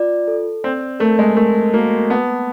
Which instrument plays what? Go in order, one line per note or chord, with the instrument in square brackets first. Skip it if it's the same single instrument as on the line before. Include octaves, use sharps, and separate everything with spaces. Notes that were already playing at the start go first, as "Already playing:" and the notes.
Already playing: [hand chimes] F4 D5
A4
[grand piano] C4 [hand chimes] D5
[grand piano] A3 [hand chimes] A#4
[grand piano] G#3
[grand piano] A3 [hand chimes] A#4
[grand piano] A#3 [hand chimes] F#4
[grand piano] B3 [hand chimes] A5